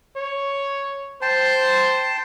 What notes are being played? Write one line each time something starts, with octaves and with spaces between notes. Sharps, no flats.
C#5
C5 G5 A5 C6